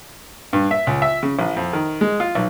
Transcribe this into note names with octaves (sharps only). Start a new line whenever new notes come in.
G2
E5
C#2
E5
C#3
A1
F2
D#3
G#3
F4
B1